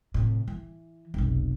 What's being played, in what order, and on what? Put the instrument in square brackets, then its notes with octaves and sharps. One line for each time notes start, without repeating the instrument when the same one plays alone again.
[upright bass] A2 C3
E3
F1 B1